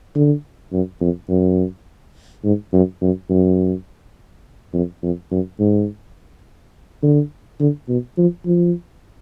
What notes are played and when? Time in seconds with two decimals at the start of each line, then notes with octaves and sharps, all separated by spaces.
0.15 D3
0.73 F#2
1.01 F2
1.29 F#2
2.44 G#2
2.73 F#2
3.02 F#2
3.30 F#2
4.73 F2
5.03 F2
5.31 F#2
5.59 G#2
7.03 D3
7.60 D3
7.89 B2
8.18 F3
8.46 F3